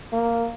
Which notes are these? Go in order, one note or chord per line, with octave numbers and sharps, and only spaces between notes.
A#3